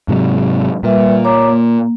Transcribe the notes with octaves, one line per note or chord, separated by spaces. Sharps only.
G#2 C3 F#3
A#2 G3 B4 E5
C#5 A#5 D6
A#3